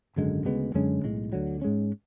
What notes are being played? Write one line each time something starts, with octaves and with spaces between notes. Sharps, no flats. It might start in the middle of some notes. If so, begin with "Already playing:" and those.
G#1 F#2 D3 G#3
D2 C#3 G#3 B3
F#2 D3 G#3 C#4
B1 A2 G#3
D2 D3 F#3
G#2 G#3 C#4